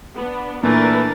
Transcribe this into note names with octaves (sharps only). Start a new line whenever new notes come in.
B3 D4
A#2 E3 A3 D4 A#4 B4 A6